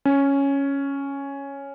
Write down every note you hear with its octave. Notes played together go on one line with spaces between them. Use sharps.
C#4